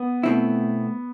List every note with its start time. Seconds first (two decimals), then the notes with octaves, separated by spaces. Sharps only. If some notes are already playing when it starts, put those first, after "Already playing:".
Already playing: B3
0.23 B2 A3 C4 E4